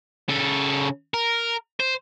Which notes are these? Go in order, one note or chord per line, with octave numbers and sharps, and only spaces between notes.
C#3 A4
A#4
C5